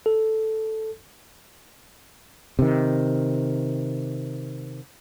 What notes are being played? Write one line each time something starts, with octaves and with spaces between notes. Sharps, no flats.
A4
C3 D#3